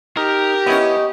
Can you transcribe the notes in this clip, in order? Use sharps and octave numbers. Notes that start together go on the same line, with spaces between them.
D#4 G4 A#4
B3 C#4 E4 C#5 D#5